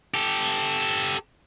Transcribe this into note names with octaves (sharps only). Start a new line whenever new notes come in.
G4 A4